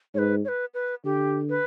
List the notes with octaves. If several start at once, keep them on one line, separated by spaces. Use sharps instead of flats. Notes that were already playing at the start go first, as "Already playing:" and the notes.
G#2 B4 C#5
C#5
B4
B4
D3 G4
B4